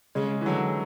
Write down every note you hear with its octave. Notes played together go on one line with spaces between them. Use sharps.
C#3 G#3
E3
D3 F#3